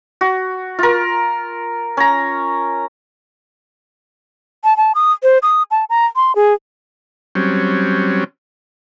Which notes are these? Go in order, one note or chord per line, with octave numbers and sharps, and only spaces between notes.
F#4
F4 A#4
C#4 A#5
A5
A5
D#6
C5
D#6
A5
A#5
C6
G#4
F#3 G3 C4 C#4